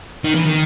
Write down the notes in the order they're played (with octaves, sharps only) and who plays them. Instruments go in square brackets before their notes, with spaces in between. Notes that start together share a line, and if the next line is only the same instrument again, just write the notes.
[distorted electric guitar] D#3
E3
D#3